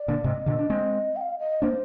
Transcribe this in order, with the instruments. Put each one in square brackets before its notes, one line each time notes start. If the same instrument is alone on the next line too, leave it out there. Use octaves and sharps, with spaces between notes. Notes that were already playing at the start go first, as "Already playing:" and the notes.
Already playing: [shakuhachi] D5
[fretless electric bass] A#2 D3
[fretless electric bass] G#2 C3 [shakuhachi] D#5
[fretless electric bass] A#2 D3
D4
G#3 C4
[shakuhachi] G5
F5
D#5
[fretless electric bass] A#3 D4 [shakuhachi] C5